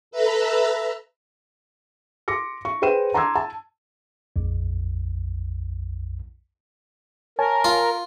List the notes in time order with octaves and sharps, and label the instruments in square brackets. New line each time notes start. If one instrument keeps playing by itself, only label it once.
[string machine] A4 B4 E5 A#5
[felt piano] C6 D6 A#6 C#7
C#6
G#4 B4 C5 G5 D#7 E7
A5 A#5 C6 D6 E6 G#6
A5
[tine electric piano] A#1 F2
[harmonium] A#4 [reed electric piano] C#5 G#5 A5
[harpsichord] F4